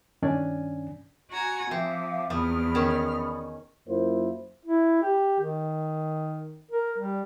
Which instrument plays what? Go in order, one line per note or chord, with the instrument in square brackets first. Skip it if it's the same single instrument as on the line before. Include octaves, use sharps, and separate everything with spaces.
[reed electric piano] G2 D#3 C#4 D4 D5 G#5
[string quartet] F#4 G#5 A#5
[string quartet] F3 [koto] C4 [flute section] E5 F5 D6
[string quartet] E2 F6 [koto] F3 [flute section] D5 B5 D#6
[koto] D#3 C#4
[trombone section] F#2 A#3 E4 F4 C5
[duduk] E4
G4
D#3
A#4
G3